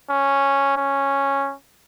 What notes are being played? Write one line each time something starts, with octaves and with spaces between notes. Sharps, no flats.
C#4
C#4